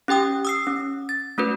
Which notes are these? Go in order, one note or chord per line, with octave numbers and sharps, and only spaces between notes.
C#4 G4 G5 D#6
D#6 E6 C7
C#4
A6
A3 C#4 F#4 B4